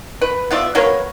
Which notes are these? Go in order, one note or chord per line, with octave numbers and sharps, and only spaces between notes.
B4
B3 F4 D5 E5
F#3 A#3 B4 C#5